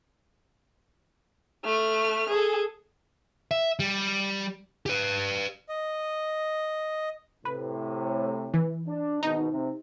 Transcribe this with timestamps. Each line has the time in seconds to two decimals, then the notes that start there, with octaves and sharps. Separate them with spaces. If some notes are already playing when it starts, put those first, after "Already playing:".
1.64 A3 F6
2.29 G#4 A4
3.51 E5
3.79 G3
4.86 G4 B4
5.69 D#5
7.45 A2 C3 B4
8.54 E3
8.88 D4
9.23 G#1 B2 D#4
9.51 C3